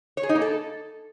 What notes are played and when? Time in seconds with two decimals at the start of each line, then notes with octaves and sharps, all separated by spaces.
0.17 C#5
0.23 G#4
0.29 D#4
0.35 A#3
0.42 A4